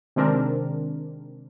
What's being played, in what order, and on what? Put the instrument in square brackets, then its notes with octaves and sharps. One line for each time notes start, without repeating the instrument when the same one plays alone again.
[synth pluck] C3 D#3 G#3 C4 D4 A#4